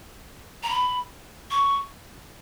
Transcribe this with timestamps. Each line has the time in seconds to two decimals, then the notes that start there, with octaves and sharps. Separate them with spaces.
0.63 A#5
0.70 B5
1.51 C#6